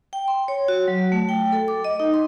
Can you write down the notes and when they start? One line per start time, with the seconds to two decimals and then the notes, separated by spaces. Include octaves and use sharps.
0.13 G5
0.28 C6
0.48 C#5
0.68 F#4
0.88 F#3
1.12 A3
1.29 G5
1.52 A4
1.68 D6
1.84 D#5
2.00 D#4
2.14 C6